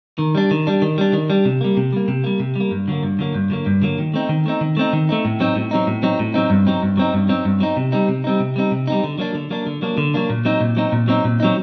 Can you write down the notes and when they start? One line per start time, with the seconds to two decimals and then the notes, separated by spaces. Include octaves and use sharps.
0.19 D#3
0.35 G3 D4
0.51 D#3
0.67 G3 D4
0.82 D#3
0.98 G3 D4
1.13 D#3
1.30 G3 D4
1.45 C3
1.61 G3 A#3
1.77 C3
1.93 G3 A#3
2.08 C3
2.24 G3 A#3
2.40 C3
2.56 G3 A#3
2.71 G2
2.88 D3 F#3 A#3
3.03 G2
3.19 D3 F#3 A#3
3.34 G2
3.50 D3 F#3 A#3
3.66 G2
3.82 D3 F#3 A#3
3.99 D#3
4.14 A3 C4 D#4
4.29 D#3
4.46 A3 C4 D#4
4.61 D#3
4.77 A3 C4 D#4
4.93 D#3
5.09 A3 C4 D#4
5.25 A2
5.40 F#3 C4 D#4
5.56 A2
5.71 F#3 C4 D#4
5.87 A2
6.03 F#3 C4 D#4
6.19 A2
6.34 F#3 C4 D#4
6.50 G2
6.67 F#3 C4 D#4
6.83 G2
6.97 F#3 C4 D#4
7.14 G2
7.29 F#3 C4 D#4
7.45 G2
7.60 F#3 C4 D#4
7.77 C3
7.92 G3 C4 D#4
8.08 C3
8.24 G3 C4 D#4
8.40 C3
8.56 G3 C4 D#4
8.71 C3
8.87 G3 C4 D#4
9.04 D3
9.18 F#3 A#3 D4
9.34 D3
9.50 F#3 A#3 D4
9.67 D3
9.82 F#3 A#3 D4
9.98 D3
10.14 F#3 A#3 D4
10.30 A#2
10.45 F#3 C4 D#4
10.61 A#2
10.77 F#3 C4 D#4
10.92 A#2
11.08 F#3 C4 D#4
11.25 A#2
11.40 F#3 C4 D#4